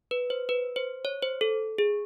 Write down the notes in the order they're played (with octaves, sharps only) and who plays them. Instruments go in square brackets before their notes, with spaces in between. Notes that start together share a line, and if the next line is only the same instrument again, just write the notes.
[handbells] B4
C5
B4
C5
C#5
C5
A4
G#4